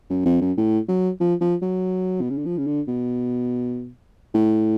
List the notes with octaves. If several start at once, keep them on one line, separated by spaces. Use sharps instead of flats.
F#2
F2
F#2
A2
F#3
F3
F3
F#3
B2
C#3
D3
F3
C#3
D3
B2
A2